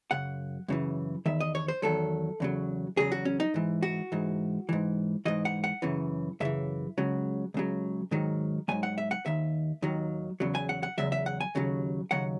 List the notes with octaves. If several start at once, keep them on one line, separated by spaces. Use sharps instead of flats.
F#2 C#3 F#5
F#2 C#3 E3
E2 D#3 E5
D#5
C#5
C5
E2 D#3 F#3 A4
E2 C#3 F#3
E2 C#3 F#3 G#4
F#4
C#4
D#4
G#2 E3
F#4
G#2 E3
G#2 E3
G#2 E3 D#5
F#5
F#5
F#2 C#3 E3
F#2 C#3 E3 E5
C#2 C#3 F#3
C#2 C#3 F#3
G#2 D#3 F#3
G#2 D#3 F#3 G#5
F#5
E5
F#5
D#2 D#3 E5
D#2 D#3 F#3
E2 C#3 F#3
G#5
F#5
F#5
E2 C#3 F#3 E5
E5
F#5
G#5
D#2 C#3 F#3
D#2 C#3 F#3 F#5